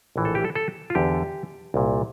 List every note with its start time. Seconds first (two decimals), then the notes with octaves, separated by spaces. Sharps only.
0.16 A#1 A2 E3
0.25 A4
0.35 G4
0.44 A4
0.55 A4
0.90 F4
0.95 E2 D3 G4
1.74 C2 A#2